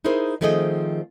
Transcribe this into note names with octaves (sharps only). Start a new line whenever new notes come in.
D#4 E4 G#4 A#4 C5
D#3 F3 A3 C4 G#4 D#5